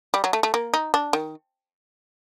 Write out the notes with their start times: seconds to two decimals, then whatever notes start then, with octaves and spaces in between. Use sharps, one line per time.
0.14 G3
0.24 F#3
0.33 A3
0.43 A3
0.54 A#3
0.74 D#4
0.94 D4
1.13 D#3